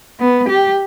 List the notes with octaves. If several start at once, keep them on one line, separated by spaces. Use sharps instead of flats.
B3
G4